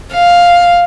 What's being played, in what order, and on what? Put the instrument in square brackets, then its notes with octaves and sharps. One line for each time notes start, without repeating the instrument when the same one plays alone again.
[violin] F5